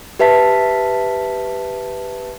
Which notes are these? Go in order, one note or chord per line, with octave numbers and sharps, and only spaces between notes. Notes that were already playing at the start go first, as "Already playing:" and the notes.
G4 B4 E5 A5 B6